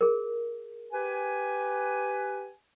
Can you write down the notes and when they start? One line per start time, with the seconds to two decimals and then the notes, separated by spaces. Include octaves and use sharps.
0.01 G#4 A#4
0.93 G4 B4 G#5